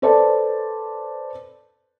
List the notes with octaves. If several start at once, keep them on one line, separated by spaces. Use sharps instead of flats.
A4 B4 C5 D5 A5